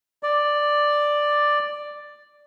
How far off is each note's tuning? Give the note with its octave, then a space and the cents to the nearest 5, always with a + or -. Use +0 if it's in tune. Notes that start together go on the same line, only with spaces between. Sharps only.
D5 +5